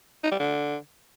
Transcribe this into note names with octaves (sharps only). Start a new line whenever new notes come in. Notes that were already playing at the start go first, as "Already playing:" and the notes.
D#4
G3
D3